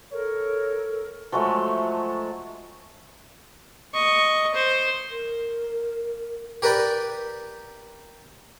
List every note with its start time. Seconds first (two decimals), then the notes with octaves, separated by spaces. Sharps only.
0.12 A4 A#4 C#5
1.32 F3 F#3 G#3 A3
3.94 D#5 C#6
4.54 C5
5.11 A#4
6.62 G4 A#4 B4 D5 G5